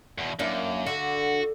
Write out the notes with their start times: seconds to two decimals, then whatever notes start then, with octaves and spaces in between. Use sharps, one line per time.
0.18 E2 B2
0.39 F#2 A#3 D4 E4
0.86 D3 F#4